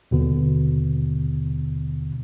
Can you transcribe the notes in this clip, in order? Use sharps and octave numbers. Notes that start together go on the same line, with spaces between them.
D#2 B2 D3